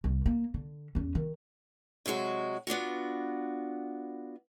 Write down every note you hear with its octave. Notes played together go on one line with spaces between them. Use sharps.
C2
A#3
D3
E2 C#4
D#3
C3 F#3 G#3 F#4
B3 D4 F4 F#4